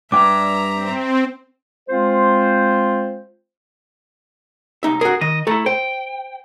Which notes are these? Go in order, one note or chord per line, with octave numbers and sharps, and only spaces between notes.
G2 E5 G5 A#5 D6
C4
G#3 C4 F4 C5
C2 D#4 E5
F#4 G#4 A#4
D#3 D#5
A3 E4 A4 A#5
C5 G5